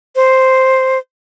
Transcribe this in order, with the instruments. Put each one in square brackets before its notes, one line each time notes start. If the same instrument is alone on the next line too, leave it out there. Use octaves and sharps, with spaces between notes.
[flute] C5